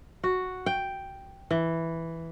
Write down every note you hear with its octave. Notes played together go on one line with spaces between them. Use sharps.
F#4
G5
E3